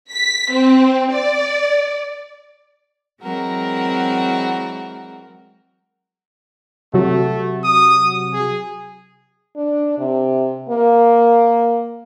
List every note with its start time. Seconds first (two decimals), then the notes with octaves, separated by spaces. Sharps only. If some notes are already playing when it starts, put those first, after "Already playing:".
0.13 B6
0.52 C4
1.13 D5
3.21 E3 F#3 G#3 C4 F#4 A#4
6.94 C3 F#3 A3 F#4
7.64 D#6
8.33 G#4
9.56 D4
9.98 C3
10.69 A#3